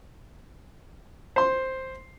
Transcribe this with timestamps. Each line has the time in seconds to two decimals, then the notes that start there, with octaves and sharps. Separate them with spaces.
1.36 C5 C6